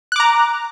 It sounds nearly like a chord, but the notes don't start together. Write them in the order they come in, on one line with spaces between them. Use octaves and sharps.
F#6 D6 A#5